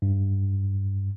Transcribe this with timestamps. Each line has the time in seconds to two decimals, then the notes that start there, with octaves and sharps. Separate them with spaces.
0.02 G2